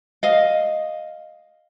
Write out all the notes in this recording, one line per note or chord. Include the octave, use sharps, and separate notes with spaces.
D#5 F5